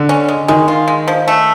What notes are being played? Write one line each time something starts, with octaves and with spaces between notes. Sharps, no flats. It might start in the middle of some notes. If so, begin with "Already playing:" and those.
Already playing: D3
C#4
G#3
D#3 G#3
F4
G#3
F3
A3